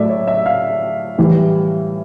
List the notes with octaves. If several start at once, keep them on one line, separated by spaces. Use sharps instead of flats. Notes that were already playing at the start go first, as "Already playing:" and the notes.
Already playing: A2 F#3 A3 D5 E5
C#5
E5
F5
A2 E3 G3